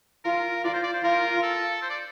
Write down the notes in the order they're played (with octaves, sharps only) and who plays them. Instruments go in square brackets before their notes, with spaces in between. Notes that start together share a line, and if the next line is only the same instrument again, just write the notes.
[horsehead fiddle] F4 [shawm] A#4
[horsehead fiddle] F4 [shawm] D5
[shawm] C5
D5
C5
[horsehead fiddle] F4 [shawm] A#4
[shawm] A4
C5
D5